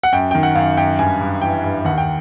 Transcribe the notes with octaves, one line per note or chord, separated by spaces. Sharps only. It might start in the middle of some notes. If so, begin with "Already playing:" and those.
F#5
F#2 G5
D#3 G5
F#5
F#2 F5
F#2 G5
G2 G#5
G2
E3 G5
G2
D#2 F#5
G5